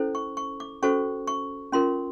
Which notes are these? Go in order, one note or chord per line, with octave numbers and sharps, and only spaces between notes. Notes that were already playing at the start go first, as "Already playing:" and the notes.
Already playing: C#4 E4 A4 C5
C#6
C#6
D6
C#4 F#4 A4 C5 C#6
C#6
C#4 F4 A#4 C6